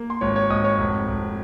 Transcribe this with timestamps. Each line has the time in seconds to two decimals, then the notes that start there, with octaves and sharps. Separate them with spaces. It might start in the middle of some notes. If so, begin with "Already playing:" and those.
Already playing: A#3
0.10 C6
0.21 G#1 C#5 C#6
0.36 C#5 C#6
0.50 G#1 D#5 D#6
0.64 C#5 C#6
0.79 F1
1.08 F1